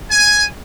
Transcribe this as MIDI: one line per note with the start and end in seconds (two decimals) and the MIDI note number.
0.11 0.46 80